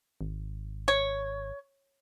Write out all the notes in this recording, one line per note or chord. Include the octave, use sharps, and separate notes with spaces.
G#1
C#5